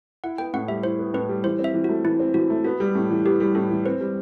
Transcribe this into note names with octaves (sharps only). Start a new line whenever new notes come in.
E4 F#5
B3 G5
A2 F#5
G3 E5
E4 C5
B3
A2 B4
G3
E3 C5
C4
E5
E3
A3 F#4
E3 E4
C4
E3 F#4
A3
B3 F#4
G3
A2
E3
B3 G4
G3
A2 A4
E3
C4 B4
G3